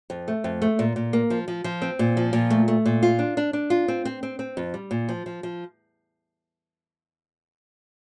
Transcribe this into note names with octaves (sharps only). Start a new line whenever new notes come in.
F2
A3
F2
A3
A#2
A#2
A#3
F3
F3
F3
C4
A#2
F3
A#2
A3
A3
A#2
F4
D4
D4
D4
F4
C4
C4
C4
C4
F2
G3
A#2
F3
F3
F3